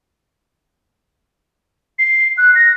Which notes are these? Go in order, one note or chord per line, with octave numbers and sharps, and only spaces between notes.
C7
F#6
A#6